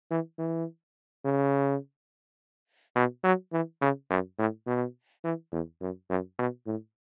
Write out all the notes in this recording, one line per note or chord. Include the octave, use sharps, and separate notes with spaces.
E3
E3
C#3
B2
F#3
E3
C#3
F#2
A2
B2
E3
E2
F#2
F#2
B2
A2